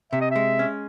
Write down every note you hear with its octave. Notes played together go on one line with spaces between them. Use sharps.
C3 E5
D#5
G#3 E5
C#4